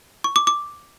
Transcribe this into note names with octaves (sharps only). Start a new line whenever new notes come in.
C#6
D6
D6